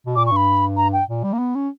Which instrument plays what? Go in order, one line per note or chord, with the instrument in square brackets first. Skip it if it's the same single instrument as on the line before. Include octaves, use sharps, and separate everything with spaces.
[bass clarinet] B2
[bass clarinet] A#2 [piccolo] D6
[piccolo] C#6
[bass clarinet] G2 [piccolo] B5
[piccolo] A#5
G5
[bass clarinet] A#2
G3
A#3
B3
C#4